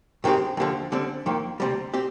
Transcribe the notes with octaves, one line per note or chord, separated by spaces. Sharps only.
G2 D#3 G#3 C4 G4
D#2 D3 F3
D3 G3 C4
F2 D#3 A#3
D2 C3 G3
C4 G4